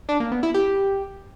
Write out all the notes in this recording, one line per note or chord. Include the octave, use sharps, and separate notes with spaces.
D4
A#3
B3
E4
G4